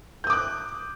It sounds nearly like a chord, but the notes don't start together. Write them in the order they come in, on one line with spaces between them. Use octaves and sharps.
G6 D#6 D6 F#6